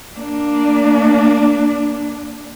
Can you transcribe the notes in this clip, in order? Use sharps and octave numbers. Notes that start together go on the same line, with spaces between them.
A#3 D4